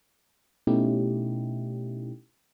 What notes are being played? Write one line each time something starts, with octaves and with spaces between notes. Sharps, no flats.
B2 A3 C#4 D#4 E4 G4